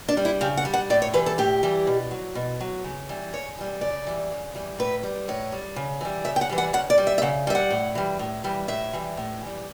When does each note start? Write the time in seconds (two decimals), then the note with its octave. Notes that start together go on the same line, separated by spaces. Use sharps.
0.09 D4
0.17 G3
0.25 E4
0.41 C#3 G4
0.57 F#5
0.65 G3
0.74 F#5
0.90 A2 D5
1.02 C#5
1.14 E3 G3 B4
1.26 A4
1.38 A2 G4
1.63 E3 G3
1.87 B2
2.11 F#3
2.35 B2
2.60 F#3
2.84 C#3
3.09 E3 G3
3.33 C#3 C#5
3.58 E3 G3
3.81 C#3 D5
4.07 E3 G3
4.31 C#3
4.55 E3 G3
4.79 A2 B4
5.03 G3
5.28 A2 C#5
5.52 G3
5.76 C#3
6.01 E3 G3
6.25 C#3 E5
6.36 G5
6.41 F#5
6.49 E3 G3
6.58 F#5
6.73 C#3 F#5
6.90 D5
6.98 G3
7.07 E5
7.18 E5
7.22 C#3 F#5
7.47 G3 E5
7.55 F#5
7.71 A2
7.95 E3 G3
8.19 A2
8.44 E3 G3
8.68 A2 E5
8.93 E3 G3
9.17 A2
9.41 E3 G3